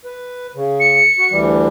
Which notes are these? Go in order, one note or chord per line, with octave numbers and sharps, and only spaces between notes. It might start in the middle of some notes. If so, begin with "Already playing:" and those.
B4
C#3
C#7
F#4
D2 E3 G3